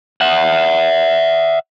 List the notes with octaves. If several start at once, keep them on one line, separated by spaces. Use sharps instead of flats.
E5 F#5